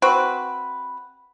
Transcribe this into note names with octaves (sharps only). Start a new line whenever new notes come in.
C4 F#4 B4